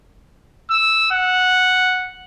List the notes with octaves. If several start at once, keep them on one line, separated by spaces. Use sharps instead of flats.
E6
F#5